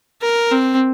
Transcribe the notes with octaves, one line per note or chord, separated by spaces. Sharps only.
A#4
C4